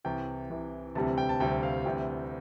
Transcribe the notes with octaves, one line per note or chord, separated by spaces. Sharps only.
C2 C3 E3 G5
C2 C3 E3
D2 C3 E3 G3 C4 A5
G5
A5
D2 C3 E3 G3 C4 G5
F5
D2 C3 E3 G3 G5